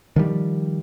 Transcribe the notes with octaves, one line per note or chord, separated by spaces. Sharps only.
D#3 F3 G3